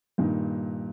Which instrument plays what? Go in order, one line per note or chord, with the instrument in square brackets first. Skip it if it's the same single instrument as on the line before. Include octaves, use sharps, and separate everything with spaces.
[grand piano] G2 A#2 D#3